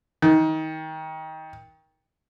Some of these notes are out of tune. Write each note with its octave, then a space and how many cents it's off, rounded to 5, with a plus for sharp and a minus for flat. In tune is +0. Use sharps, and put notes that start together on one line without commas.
D#3 +25